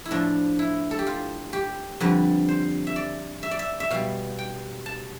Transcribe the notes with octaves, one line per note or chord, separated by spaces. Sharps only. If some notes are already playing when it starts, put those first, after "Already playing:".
E4
A2 F3 D4
E4
A4
G4
F4
G4
F2 D3 G3 B4
C5
E5
D5
E5
D5
E5
E5
B2 G3 F5
G5
A5